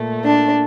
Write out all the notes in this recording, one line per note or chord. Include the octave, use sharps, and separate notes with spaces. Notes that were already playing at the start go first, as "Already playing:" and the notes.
Already playing: A#2 A3
D4